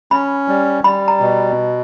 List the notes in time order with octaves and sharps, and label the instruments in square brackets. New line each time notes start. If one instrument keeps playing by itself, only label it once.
[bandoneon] C#4 [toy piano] B5
[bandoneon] G3
[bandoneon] G3 [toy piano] B5
[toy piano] A#5
[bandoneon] B2